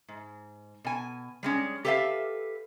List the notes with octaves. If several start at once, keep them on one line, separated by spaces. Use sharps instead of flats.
G#2
B2 G#5
G3 G#3 C#4
G4 A4 B4 C#5 E5 F5